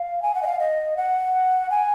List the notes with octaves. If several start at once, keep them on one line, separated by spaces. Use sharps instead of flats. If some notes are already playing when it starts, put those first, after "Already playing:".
Already playing: F5
G#5
F#5
D#5
F5
D#5
F#5
G#5